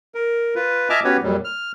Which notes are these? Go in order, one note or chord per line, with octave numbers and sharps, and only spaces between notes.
A#4
F4 B4
D#5 E5 G#5 A5 D6 F6
B3 C#4 F#4 G4 B4 C#5
F2 A#2 F#3 G3
F6